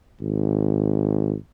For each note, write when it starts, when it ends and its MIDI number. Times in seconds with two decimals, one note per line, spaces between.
0.21 1.35 32